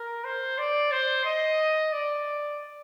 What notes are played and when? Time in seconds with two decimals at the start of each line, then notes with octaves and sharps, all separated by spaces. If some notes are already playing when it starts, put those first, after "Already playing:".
Already playing: A#4
0.25 C5
0.58 D5
0.92 C5
1.25 D#5
1.93 D5